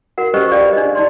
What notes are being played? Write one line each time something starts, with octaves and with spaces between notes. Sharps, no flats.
F#4 A#4 F#5
C#4 G4 B4 C5 D#5 C#6
F4 G#4 D5 F5 G5
D4 D#5
D#4 D5 C6